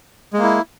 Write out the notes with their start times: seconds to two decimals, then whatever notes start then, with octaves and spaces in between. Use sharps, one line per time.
0.34 G#3
0.38 A#3
0.43 E4